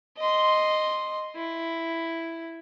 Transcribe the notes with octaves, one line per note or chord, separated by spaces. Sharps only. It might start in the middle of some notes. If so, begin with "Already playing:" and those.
D#5 C6
E4